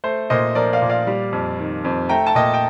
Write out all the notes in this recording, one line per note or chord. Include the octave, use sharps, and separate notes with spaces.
A3 C5
A#2 C5 D#5
F3 A#4 D5
D5 F5
A#2
D5 F5
G3
F2
D#3
F2
A3 G5 A#5
A5
A#2 D#5 G5
G5